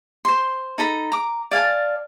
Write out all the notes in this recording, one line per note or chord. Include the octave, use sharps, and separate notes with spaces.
C5 C6
D#4 A4 A#5 B5
A#5 D6
D5 F5 G#5 A5